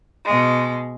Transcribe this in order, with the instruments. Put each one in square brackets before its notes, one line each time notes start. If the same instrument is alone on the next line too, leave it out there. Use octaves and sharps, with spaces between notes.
[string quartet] B2 G#3